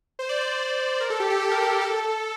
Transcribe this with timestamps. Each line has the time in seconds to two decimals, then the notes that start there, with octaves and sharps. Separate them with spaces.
0.19 C5
0.29 D5
0.41 C5
1.00 A#4
1.10 A4
1.20 G4
1.30 G4
1.40 A4
1.51 A#4
1.61 A4
1.81 A4